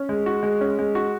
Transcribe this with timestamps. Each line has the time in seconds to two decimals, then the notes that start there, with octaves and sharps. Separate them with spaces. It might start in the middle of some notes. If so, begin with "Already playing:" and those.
Already playing: C#4
0.09 G#3
0.26 F#4
0.43 G#3
0.61 C#4
0.79 G#3
0.95 F#4